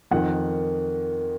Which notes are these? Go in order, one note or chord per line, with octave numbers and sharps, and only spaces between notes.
F2 D#3 F#5